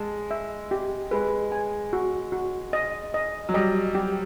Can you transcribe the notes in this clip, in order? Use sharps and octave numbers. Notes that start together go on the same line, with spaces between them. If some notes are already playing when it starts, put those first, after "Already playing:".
Already playing: G#3 A5
E5
G4
G#3 B4
G#5
F#4
F#4
D#5
D#5
F#3
G3 D#5
G4